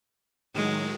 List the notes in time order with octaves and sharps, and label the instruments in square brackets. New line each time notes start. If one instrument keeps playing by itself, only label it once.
[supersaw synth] A2 D#3 F#3 [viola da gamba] G#3